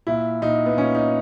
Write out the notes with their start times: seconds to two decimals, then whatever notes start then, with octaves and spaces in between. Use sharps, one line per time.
0.07 A#2 E4
0.42 A#2 D#4
0.66 B3
0.77 A#2 C#4
0.95 D#4